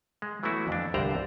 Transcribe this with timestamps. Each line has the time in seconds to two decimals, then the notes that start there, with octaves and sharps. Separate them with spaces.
0.22 G#3
0.43 E3 F#3 A3 B3 E4 F#4
0.68 F2 D4
0.94 C2 G2 D3 C5 D5 A#5